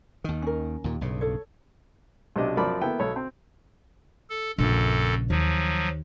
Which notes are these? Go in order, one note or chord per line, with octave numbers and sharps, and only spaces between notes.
D#2 D#3
C#4 A#4
D#2 A#2
B1 G2 C#3
A4 C#5
B1 C3 D4 D#5
F#2 F3 A#4 D5 B5 D6
A#3 B3 E4 A4 G5
B1 A4 C#5 B5
C4
A4
A#1 F#2 C#3 A4
D#2 F3 F#3